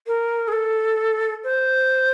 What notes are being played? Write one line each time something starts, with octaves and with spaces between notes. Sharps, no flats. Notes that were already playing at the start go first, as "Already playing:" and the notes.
A#4
G#4
A4
C5